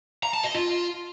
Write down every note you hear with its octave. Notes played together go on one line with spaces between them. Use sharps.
A#5
A5
D#5
F4